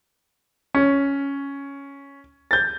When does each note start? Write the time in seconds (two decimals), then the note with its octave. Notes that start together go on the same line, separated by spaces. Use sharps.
0.75 C#4
2.51 G6 A6